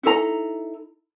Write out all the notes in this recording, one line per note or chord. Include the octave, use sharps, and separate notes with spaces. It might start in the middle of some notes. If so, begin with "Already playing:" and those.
D#4 E4 A4 A#5